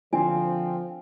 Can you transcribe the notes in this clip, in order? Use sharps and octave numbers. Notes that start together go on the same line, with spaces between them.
D3 F3 C4 D5 G#5